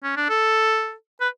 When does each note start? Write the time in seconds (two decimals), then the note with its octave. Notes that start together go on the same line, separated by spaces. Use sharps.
0.03 C#4
0.17 D4
0.29 A4
1.21 B4